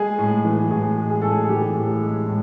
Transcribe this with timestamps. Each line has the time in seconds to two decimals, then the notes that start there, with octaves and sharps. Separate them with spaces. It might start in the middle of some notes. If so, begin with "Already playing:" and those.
Already playing: G#3 G#4
0.18 A2
0.44 E3
0.71 A2 G#4
0.98 G#3
1.10 G#4
1.22 A2 A4
1.32 G#4
1.49 E3 G4
1.75 A2
2.01 G#3
2.27 A2